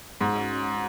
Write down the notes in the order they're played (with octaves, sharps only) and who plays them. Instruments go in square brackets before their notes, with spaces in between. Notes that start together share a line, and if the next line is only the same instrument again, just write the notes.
[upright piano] G#2 [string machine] G#3 C#4 F#4